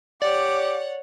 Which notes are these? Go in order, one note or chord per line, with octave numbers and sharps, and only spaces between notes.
G4 C#5 D5 F#5 D6